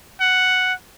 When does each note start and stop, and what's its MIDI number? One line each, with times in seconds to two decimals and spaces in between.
0.20 0.73 78